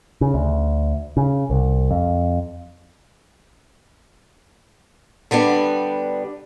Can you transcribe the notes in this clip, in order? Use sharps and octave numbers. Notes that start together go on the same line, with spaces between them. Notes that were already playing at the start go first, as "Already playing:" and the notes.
C#3
D2
C#3
C2
F2
D3 G3 B3 D4